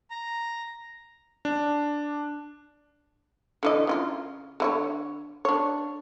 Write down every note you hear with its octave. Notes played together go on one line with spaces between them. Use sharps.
A#5
D4
D3 E3 D#5
C#3 C#4 F4
D3 E4 C#5
D4 C#5